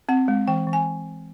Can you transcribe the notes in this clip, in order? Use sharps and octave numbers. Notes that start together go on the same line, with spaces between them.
C4 F#5
G#3
E3 G5
E3
G#5